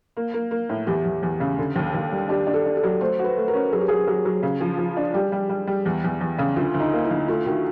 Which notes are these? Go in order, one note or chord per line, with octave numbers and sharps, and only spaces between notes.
A#3
A#3
A#3
A2
E2 G4
E2
E2
C#3
D3
D#2
D#2
G3
D4 G4
D4
A4
D4
A4
F#3
A3 C5
F#4
B4
A3
A#4
C#4
F#3 G#4
G4
F#3 G#4
F#3
F#3
C#3
F3
F3
D4
G3 G4
G3
G3
G3
E2
E2
E2
C#3
D2 F4
D2
D#4
A#3
E4
D2
A3 F4
D#3 F#4